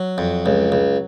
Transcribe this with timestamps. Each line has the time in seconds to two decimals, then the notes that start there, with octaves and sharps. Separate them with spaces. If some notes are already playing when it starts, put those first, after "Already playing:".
Already playing: F#3
0.18 F2
0.46 C#2
0.72 C#2